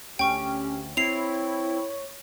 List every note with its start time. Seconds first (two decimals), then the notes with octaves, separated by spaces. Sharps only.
0.19 D2 C#4 G4 G5 C#6
0.97 C4 E4 C#5 C7 F7